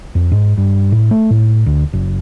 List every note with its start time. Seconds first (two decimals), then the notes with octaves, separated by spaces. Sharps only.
0.15 F2
0.32 G#2
0.58 G2
0.92 A2
1.11 A3
1.31 A2
1.66 D2
1.93 F#1